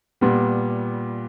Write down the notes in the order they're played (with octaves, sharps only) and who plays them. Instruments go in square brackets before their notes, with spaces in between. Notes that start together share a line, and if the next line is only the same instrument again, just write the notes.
[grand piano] A#2 G3 B3